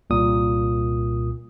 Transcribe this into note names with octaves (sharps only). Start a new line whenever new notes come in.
C2 A#2 D#6